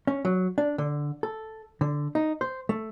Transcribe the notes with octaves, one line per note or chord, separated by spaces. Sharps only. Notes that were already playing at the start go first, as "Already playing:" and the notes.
C#4
F#3
D4
D3
A4
D3
D#4
C5
A3